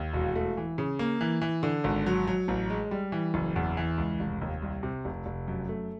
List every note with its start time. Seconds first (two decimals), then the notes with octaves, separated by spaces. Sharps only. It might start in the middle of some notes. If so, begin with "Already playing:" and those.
Already playing: D#2
0.13 E1
0.35 A3
0.57 E3
0.78 C#3
0.99 A#3
1.21 E3
1.41 E3
1.63 D3
1.84 G#1
2.06 F#3
2.27 F#3
2.48 A1
2.70 G#3
2.91 G3
3.12 E3
3.34 F#1
3.56 E2
3.77 E3
3.98 C#2
4.20 F1
4.41 D#2
4.62 C2
4.83 C3
5.05 F1
5.26 F1
5.48 F#2
5.69 A3